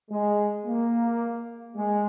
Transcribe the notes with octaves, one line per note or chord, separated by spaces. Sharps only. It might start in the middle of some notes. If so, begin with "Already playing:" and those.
G#3
A#3
G#3